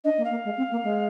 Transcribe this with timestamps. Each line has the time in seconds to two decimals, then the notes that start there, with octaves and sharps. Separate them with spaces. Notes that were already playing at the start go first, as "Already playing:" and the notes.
0.04 D4 D#5
0.18 A#3
0.25 F5
0.30 A#3
0.44 G#3
0.57 C4
0.71 A#3
0.84 G#3